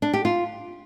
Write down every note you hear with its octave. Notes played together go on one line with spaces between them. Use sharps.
D4
G4
F4